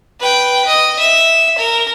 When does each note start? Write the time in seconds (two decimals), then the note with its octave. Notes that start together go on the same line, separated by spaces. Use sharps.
0.20 B4 G5
0.67 D#5
0.99 E5
1.58 A#4